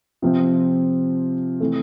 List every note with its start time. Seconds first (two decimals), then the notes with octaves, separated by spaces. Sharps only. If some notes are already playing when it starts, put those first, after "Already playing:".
0.22 C3 F3 C4
1.60 C3 E3 A3